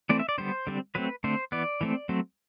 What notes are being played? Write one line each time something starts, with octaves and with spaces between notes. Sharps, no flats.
E3 A3 C4 D5
E5
D5
D3 G3 B3 C5
D3 G3 C4
F#3 A3 C4 B4
D3 A3 C4 C5
E3 B3 D5
E3 A3 C4
F#3 A3 C4